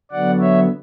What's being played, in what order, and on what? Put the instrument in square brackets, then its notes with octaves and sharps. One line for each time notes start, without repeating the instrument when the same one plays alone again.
[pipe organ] D3 F#3 B3 D5 F#5
C#5 E5